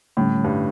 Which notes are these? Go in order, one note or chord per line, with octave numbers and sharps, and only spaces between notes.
A2 D3 G3 C#4
G2